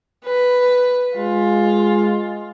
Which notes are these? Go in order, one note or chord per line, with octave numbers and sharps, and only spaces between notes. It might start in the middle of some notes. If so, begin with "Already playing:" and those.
B4
G#3 F4